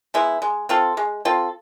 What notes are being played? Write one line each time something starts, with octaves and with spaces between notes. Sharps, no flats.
G#3 B3 E4
G#3
C4 F4 A4
G#3
C4 F4 A4